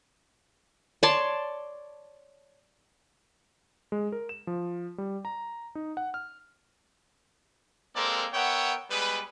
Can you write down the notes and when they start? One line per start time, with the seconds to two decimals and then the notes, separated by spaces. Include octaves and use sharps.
1.03 C#5 D5 A5 C6
3.92 G#3
4.12 A#4
4.29 E7
4.47 F3
4.98 G3
5.25 A#5
5.75 D#4
5.97 F#5
6.14 F6
7.95 G#3 A#3 C4 A4 A#4 D5
8.33 B3 A#4 C#5 E5 F#5 G5
8.90 G3 G#3 B3 B4